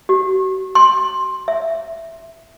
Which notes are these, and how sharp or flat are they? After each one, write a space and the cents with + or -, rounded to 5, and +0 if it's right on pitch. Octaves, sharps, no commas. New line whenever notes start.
F#4 +40
C6 +10
E5 +0